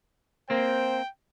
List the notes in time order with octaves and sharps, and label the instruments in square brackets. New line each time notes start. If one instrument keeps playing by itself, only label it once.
[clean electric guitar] A#3 C4 [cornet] C5 [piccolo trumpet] G5